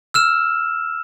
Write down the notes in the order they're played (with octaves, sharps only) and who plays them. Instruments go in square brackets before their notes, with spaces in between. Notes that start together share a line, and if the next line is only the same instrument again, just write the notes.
[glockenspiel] E6 F6 E7